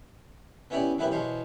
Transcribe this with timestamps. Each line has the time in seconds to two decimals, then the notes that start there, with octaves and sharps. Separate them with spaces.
0.70 B3 C#4 E4 G4 C#5 D5
0.98 F#2 B3 E4 G4 B4 E5
1.11 E2 B2 C5 C#5